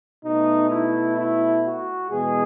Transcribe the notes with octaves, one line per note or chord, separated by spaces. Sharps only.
B2 A3 D#4
E4
E4
F#4
E2 B2 G#3 G#4